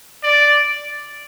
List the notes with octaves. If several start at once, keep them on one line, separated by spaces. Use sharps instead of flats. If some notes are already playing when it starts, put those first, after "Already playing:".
D5